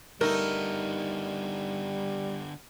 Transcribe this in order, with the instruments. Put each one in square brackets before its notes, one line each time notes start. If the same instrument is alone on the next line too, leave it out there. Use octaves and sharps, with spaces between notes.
[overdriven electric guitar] D3 B3 [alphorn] G3 [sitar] A3 D#4 [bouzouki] A#4